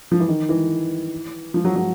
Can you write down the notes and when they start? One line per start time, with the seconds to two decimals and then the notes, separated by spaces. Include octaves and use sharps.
0.12 F3
0.20 E3
0.28 D#3
0.49 E3
1.54 F3
1.65 F#3
1.76 F#3